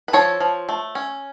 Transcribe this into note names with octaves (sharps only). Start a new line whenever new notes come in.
B4
F3 A4 C#5
F3
A3
C#4